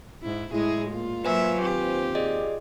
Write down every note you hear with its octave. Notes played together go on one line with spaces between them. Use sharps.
G#2 E4
A2 G#3 E4 G#4
A#2 A#3 F4
F#3 A#3 B4 C5 E5 G#5
D#2 C4 G4
G#4 D5 D#5